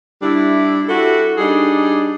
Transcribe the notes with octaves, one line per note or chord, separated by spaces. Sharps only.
G3 D4 E4
E4 F#4 G4 A4
G3 D4 D#4 G#4